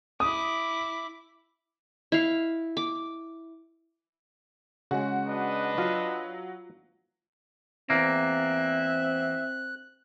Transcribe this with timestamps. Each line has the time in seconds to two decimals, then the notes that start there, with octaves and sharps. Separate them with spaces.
0.20 E4 D6 D#6
2.12 E4 F5
2.77 D6
4.91 C#3 G#3 F#4
5.27 D4 B4 D#5
5.78 F#3 F4 F5
7.90 E2 A#3 C4 E5 F#6